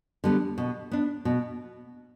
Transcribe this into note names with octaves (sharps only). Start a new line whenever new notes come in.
D3 G3 B3
B2
B3 D4
B2